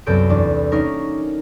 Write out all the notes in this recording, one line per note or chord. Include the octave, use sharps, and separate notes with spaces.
C2 F#2 B3 A4 G6 D7
E2 D4
A#3 C#4 D#4 A#4